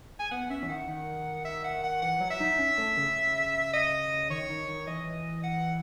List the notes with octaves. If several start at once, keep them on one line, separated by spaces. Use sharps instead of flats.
G#5
B3 F#5
C#4 E5
E3
D#3 F#5
D#3
E5
F#5
F#5
E3 F#5
F#3
E5
D#4
C#4
A3
C#3
D#5
D#3 C#5
D#3
D#3
E3 D#5
F#5